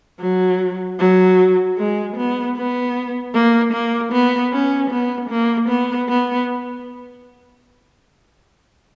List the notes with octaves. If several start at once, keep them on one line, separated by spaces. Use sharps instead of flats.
F#3
F#3
G#3
B3
B3
A#3
A#3
B3
C#4
B3
A#3
B3
B3